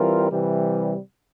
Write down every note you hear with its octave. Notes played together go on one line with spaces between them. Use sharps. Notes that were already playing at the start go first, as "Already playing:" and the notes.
Already playing: E3 G3 C4 F4 A#4
C3 E3 G3